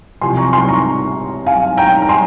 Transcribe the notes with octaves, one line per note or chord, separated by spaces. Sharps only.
C2 C3 F3 G#5 C6
A#5 C#6
G#5 C6
A#5 C#6
F5 G#5
G5 A#5
A#5
G#5 C6